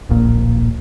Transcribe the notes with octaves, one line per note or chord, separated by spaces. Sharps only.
D1 A#1 A#2